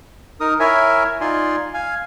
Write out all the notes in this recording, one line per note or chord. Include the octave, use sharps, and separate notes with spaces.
D#4 A#4 D#6
E4 A#4 C#5 E5 G#5
D#4 F4 D5 G#5 C6
F5 G#5